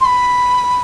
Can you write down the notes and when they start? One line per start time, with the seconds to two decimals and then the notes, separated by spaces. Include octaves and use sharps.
0.01 C6
0.06 B5